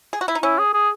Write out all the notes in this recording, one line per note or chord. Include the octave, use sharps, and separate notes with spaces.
G#4
F#4
E4
D#4
C#4 E4
G#4
G#4